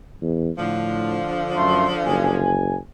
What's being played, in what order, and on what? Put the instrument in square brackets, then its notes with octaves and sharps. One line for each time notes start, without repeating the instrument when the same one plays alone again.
[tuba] E2
[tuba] A2 [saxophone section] D3 F3
[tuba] F#2 [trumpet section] A3 C6
[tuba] F#1 [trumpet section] G#5